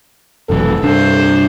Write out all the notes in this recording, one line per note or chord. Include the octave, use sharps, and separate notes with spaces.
F1 B1 E3 A4
C2 G2 D4 C5